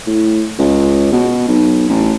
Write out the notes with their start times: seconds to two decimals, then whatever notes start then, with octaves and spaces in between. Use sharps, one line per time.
0.07 A2
0.59 C#2
1.12 B2
1.48 B1
1.89 A1